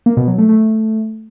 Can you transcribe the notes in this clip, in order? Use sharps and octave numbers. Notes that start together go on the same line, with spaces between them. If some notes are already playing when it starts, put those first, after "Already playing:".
A#3
B2
F#3
A3
A3